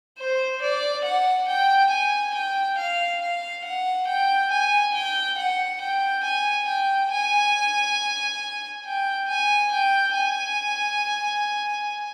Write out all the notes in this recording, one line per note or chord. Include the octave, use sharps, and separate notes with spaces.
C5
D5
F#5
G5
G#5
G5
F5
F5
F#5
G5
G#5
G5
F#5
G5
G#5
G5
G#5
G5
G#5
G5
G#5